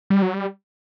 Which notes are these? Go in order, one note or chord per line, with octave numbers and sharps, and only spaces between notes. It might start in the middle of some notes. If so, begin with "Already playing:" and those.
G3
F#3
G3